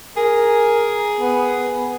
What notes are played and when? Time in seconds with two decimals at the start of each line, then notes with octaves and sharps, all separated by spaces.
0.17 G#4 A#4
1.21 B3